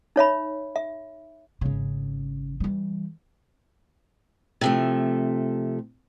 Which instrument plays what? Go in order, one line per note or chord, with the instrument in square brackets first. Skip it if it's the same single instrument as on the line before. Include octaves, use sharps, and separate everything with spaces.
[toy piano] D#4 C#5 E5 B5
E5
[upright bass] G#1 C#3
E3 G3
[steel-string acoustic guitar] C3 F3 A3